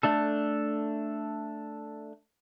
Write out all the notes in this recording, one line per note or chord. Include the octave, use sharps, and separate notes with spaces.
A3 D4 A4